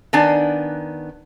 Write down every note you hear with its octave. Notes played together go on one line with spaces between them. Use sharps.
D#3 B3 D4 D5 G#5